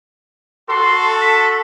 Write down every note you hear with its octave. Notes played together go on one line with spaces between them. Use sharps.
F#4 A4 C6
B6